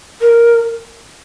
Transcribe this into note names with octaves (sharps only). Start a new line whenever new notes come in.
A#4